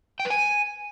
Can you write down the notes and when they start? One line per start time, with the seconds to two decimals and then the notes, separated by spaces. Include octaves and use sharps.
0.20 G5
0.25 B4
0.30 G#5